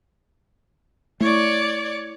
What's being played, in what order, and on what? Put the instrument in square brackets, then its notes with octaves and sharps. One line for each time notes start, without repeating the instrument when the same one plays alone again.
[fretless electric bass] A3 [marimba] E4 C#6 [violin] C#5 D5